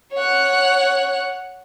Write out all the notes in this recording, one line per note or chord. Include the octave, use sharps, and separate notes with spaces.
C#5 F#5